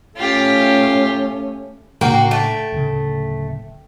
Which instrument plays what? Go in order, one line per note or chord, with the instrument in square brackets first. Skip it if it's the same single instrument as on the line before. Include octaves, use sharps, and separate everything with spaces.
[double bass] A3 C#4 [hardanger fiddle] F4 G4
[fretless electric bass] A2 C#3 D4 [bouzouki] A#3 F#4 [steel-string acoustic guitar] G5
[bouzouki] A3
[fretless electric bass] D1 C#3